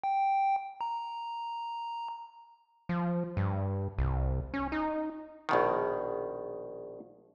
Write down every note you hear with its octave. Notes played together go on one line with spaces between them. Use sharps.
G5
A#5
F3
G2
C2
C#4
D#4
A#1 B2 D#3